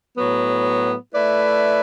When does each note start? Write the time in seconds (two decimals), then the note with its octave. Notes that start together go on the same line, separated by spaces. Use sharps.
0.17 A2 F#3 B3
1.15 A3 E4 B4 D5